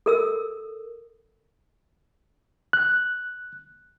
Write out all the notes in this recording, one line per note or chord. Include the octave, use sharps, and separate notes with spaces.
A4 A#4 E6
F#6